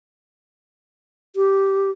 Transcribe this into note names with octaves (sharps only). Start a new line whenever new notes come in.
G4